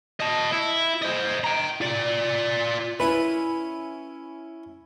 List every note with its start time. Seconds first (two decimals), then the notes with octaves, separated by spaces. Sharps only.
0.20 D#5 A5
0.53 E4
1.02 C5 D#5
1.44 G5 A#5
1.81 F4 D5
3.00 C#4 E4 B4